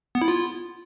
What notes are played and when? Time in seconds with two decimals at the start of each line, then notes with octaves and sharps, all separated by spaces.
0.15 B3
0.22 E4
0.28 F4